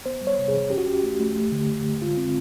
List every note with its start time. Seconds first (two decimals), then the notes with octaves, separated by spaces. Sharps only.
0.06 B3 C5
0.21 G3
0.27 C#5
0.38 C3
0.48 G#4
0.55 E3
0.70 C#4 G4
0.78 F#4
0.86 C#4 G4
1.04 A3
1.20 A3
1.35 A3
1.52 D3
1.69 D3
1.85 D3
2.01 G#3 F4
2.17 C4